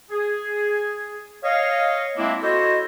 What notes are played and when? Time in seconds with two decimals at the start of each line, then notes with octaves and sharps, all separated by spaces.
0.10 G#4
1.43 C#5 D#5 F5
2.16 G#3 A#3 C4 D4 E4
2.42 E4 F#4 A4 C5 C#5 D#5